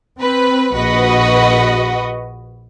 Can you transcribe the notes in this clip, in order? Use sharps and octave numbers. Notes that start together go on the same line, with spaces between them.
C4 B4
A#1 F#4 B4 D#5